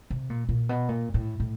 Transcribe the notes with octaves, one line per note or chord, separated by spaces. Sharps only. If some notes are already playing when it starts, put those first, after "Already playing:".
C3
A#2
A#2
B2
A#2
A2
A2